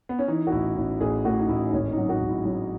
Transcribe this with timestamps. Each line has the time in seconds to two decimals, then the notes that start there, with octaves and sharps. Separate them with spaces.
0.09 B3
0.19 C#4
0.28 E3 D#4
0.47 F#4
0.52 A1 E4
0.76 A1 E4
1.00 A1 G#4
1.25 A2 F#4
1.39 D#4
1.49 A1 E4
1.69 D#4
1.73 G#1 C#4
1.92 D#4
1.97 F#3
2.09 F#4
2.22 G#1
2.28 E4
2.45 F#3